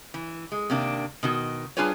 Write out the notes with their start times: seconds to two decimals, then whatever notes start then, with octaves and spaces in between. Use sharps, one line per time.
0.14 E3
0.52 G#3
0.70 C3 D#3 A#3 D4
1.23 B2 D#3 F#4
1.77 G3 D4 F4 G#4 B4 C#5